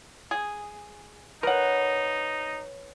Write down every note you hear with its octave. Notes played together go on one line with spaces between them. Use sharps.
G#4
D#4 A#4 B4 C#5 F#5